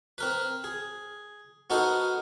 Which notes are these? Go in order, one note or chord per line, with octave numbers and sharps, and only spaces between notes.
C4 A#4 B4
G#4
B3 D#4 F#4 A4 A#4 C5